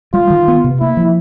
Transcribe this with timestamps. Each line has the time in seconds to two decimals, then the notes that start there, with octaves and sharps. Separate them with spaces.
0.14 G3 F4
0.30 D#3
0.48 B3
0.64 C3
0.80 A#3 E4
0.97 F3